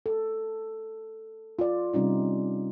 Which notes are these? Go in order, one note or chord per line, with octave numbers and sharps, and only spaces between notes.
A4
F4 D5
C3 G3 C#4 D#4 F4